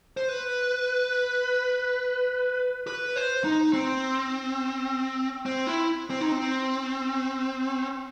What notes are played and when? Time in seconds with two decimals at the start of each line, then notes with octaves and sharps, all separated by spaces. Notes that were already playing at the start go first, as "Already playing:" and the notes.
0.17 C5
0.29 B4
2.87 B4
3.16 C5
3.44 D#4
3.73 C4
5.46 C4
5.67 E4
6.10 C4
6.21 D#4
6.32 C4